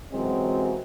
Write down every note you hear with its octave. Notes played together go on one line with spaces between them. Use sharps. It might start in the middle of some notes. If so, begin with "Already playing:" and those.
F#2 C3 E3 F#3 G#3 C4